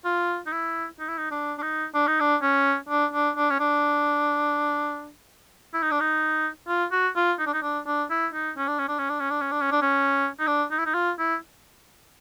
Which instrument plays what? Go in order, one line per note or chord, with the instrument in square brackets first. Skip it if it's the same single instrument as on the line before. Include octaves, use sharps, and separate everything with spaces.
[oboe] F4
D#4
E4
D#4
E4
D#4
D4
D4
D#4
D4
D#4
D4
C#4
D4
D4
D4
C#4
D4
E4
D#4
D4
D#4
F4
F#4
F4
D#4
D4
D#4
D4
D4
E4
D#4
C#4
D4
C#4
D4
C#4
D4
C#4
D4
C#4
D4
C#4
D4
C#4
D#4
D4
D#4
E4
D#4
F4
E4